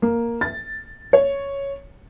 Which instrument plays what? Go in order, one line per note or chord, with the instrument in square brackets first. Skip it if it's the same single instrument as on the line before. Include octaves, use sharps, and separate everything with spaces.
[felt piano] A#3
A6
C#5